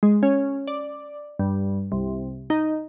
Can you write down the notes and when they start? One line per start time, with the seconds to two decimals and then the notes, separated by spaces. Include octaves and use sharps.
0.03 G#3
0.23 C#4
0.67 D5
1.39 G2
1.92 C2
2.50 D#4